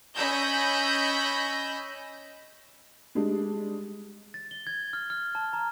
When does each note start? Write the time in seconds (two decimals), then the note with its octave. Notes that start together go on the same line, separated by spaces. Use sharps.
0.15 C#4 D#5 B5 E6 G6 A#6
3.15 G3 G#3 D4
4.34 A6
4.51 G7
4.67 G#6
4.93 F6
5.10 F6
5.35 A5
5.53 A#5